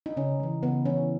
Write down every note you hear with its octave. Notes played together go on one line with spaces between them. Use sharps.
D#4
C#3 C#4
E3 G#3
C#3 B3
E3 G#3 C#4